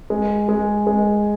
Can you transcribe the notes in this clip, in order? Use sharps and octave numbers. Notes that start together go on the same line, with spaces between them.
G#3
G#3
G#3